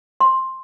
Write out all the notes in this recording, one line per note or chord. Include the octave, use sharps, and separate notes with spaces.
C6